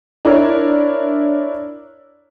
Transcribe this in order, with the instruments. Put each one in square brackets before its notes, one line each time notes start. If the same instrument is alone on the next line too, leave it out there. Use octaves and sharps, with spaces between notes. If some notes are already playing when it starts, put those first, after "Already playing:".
[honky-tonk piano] D4 E4 A#4 C#5